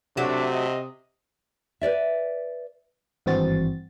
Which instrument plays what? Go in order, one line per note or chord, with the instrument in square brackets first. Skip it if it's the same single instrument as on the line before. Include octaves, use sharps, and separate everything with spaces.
[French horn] C3 [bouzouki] F#3 A3 [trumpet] D4
[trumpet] D#5
[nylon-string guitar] B4 C#5 D5 E5
[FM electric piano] G#1 G2 E3 C4 F#4 A6